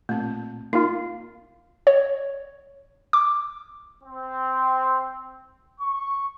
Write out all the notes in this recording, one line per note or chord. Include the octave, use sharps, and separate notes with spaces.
A#2 A3 C4
A#3 D#4 F4
C#5
D6
C4
C#6